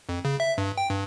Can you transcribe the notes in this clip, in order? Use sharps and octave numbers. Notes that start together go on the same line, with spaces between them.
F2
C#3
E5
G2
G5
G2